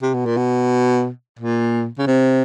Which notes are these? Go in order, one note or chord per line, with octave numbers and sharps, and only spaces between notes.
C3
B2
A#2
B2
A#2
C#3
C3